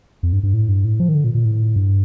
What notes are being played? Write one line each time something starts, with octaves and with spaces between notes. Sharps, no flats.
F2
G2
G2
A2
G2
A2
F3
D#3
D3
A#2
A#2
A2
G2